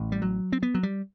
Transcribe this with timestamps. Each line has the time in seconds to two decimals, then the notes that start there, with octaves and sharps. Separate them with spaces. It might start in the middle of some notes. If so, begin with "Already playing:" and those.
Already playing: A1 A2
0.12 G3
0.22 F#3
0.52 C4
0.63 B3
0.74 F#3
0.83 G3